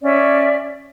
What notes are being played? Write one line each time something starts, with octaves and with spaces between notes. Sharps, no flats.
C#4 C#5 D5 E5